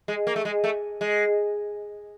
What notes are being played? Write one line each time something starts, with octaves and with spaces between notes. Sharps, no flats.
G#3
A#3
A3
G#3
A3
G#3